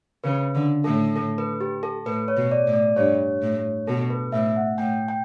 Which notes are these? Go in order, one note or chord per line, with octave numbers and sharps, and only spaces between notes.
C#3 B4
D3
A2 A4
A4
B4
G4
A4
A2 B4
C#5
B2
D5
A2
D5
G2 C#5
A2
B2 A4
B4
A2 E5
F#5
A2 G5
G5